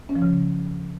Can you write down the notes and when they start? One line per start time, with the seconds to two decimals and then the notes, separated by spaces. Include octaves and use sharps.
0.09 C#4
0.16 F3
0.22 C#3